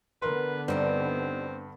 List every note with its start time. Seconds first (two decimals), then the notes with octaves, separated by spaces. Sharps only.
0.22 D3 B3 A#4 B4 C6
0.68 G2 G3 C4 D#4 E4